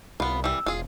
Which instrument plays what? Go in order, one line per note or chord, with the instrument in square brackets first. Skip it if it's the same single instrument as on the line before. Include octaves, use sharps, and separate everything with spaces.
[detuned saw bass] C2 [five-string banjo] B3 F4 [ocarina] B5
[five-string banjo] E3 G3 [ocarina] E6
[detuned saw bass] E1 [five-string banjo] F4 G#4